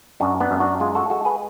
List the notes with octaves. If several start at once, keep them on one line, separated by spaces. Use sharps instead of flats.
F#2 D4 F#4
B3 D4
F#2
D4 F#4
G#3 F4 G#4
F#4 A4
G#3 F#4 A4
G#4 B4